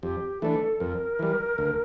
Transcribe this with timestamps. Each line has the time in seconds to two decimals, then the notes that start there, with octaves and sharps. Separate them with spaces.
0.02 F2 G4
0.41 E3 A3 D4 A4
0.80 F2 A#4
1.19 E3 G3
1.58 D2